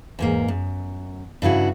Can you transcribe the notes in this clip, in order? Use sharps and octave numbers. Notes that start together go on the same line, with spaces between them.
E2 G#2 A#3
F#2
G2 C#3 E4 F#4